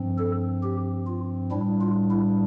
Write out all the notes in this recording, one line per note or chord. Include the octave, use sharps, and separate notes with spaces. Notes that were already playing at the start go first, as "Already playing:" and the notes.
Already playing: G2 F3 C4
A4
G4
F4
A2 G3 D4 E4
F4
E4